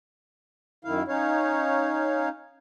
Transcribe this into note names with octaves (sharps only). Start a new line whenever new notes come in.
F#2 D#3 E4 F5
C#4 D#4 C#5 F5